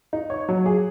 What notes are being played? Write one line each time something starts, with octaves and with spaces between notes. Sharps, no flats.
D#4
C#5
F#3
G#4